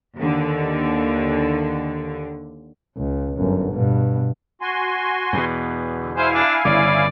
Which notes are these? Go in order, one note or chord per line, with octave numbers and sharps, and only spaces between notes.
D#2 D3
C#2
G1 F#2
G2 B2
F#4 G#5 C6
E2 B2
D3
E4 C5 F5 G#5
D4
G1 C#3 D5